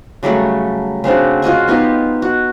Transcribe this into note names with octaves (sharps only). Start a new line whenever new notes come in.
C#3 F#3 G3 A3
C#3 C4 D4 F#4
F4 F#4 D#5 C#6
B3 D#4 F4 G4
F#4